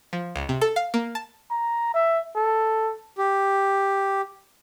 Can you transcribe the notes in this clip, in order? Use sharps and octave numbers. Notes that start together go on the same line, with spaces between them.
F3
C#2
C3
A4
F5
A#3
A5
A#5
E5
A4
G4